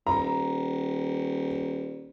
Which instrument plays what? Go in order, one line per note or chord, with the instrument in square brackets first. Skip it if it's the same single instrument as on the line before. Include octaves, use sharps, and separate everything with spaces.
[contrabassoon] D#1 [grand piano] A#5